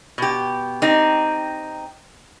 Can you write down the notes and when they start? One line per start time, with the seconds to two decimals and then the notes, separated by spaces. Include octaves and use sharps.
0.18 B2 G4
0.82 C4 D#4 G4